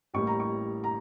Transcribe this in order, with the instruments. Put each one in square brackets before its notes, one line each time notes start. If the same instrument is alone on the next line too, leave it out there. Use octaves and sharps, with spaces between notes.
[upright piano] A1 A2 G3 A#3 C#6
A#5
C#6
A#5